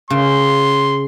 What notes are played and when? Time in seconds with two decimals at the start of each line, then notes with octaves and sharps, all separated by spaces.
0.10 C#3 C6